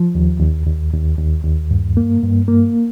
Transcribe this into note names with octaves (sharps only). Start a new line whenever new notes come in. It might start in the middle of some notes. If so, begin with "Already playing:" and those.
Already playing: F3
D#2
D#2
D#2
D#2
D#2
D#2
G2
A#3
G2
A#3